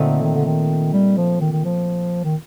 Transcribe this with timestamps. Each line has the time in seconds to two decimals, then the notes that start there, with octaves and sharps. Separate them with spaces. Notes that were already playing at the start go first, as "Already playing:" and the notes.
Already playing: A#2 D3 A3 C4 D#4
0.23 D#3
0.35 D3
0.46 D#3
0.93 G3
1.17 F3
1.40 D#3
1.52 D#3
1.65 F3
2.24 D#3